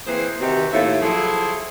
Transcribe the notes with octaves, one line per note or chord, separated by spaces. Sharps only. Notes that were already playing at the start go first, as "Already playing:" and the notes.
E3 A#3 C4 G#4 C5
C3 D#3 E3 D#4 F#4 G4
D#2 A2 F4 C#5 E5
F3 F#3 E4 G#4 A4